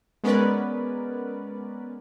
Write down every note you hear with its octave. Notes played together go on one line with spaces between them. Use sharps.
G#3 B3 C#4 A#4 B4 D5